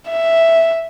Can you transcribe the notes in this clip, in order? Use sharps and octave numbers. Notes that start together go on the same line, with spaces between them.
E5